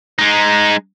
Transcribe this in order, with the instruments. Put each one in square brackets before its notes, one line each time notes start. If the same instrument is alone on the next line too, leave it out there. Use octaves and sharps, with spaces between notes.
[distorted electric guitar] G#3 D#4